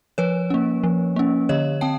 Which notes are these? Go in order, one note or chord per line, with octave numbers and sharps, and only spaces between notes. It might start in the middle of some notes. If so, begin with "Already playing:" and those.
F3 B4 C#5
A#3 C#4
F3
A#3 C#4
D3 C#5 D#5
C4 G5 A5